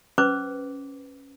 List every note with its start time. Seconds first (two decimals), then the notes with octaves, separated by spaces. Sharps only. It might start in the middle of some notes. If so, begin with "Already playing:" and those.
0.18 C#4 B4 C5 D6